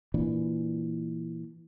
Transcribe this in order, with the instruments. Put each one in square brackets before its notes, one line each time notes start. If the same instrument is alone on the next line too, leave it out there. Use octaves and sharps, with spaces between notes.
[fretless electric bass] A#2 E3 D4